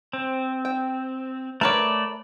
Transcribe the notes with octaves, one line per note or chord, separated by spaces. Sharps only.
C4
G5
A3 A#4 B4 C#5 D5